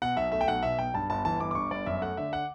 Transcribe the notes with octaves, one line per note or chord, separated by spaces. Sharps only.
B2 F#5
B1 E5
A3 E5
G5
B1 F#5
B2 E5
B1 G5
G2 A5
G1 A5
E3 A5
G1 D6
D6
G2 C#6
G1 D5
F#2 E5
A3 F#5
D3 E5
F#5